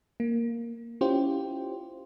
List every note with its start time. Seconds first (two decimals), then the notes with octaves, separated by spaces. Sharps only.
0.20 A#3
1.01 C#4 E4 F4 G4 C5